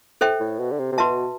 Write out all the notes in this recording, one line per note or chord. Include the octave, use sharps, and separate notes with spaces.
A4 C5 E5 G5
A2
B2
D3
C3
C3
B2 F#4 B4 E5 A5